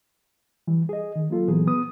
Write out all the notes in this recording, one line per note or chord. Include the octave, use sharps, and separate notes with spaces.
E3 G3
G#4 D#5
D#3
F#3 A#3 F4 A4
A#2 E3 F#3 B3 G#4
B3 D#6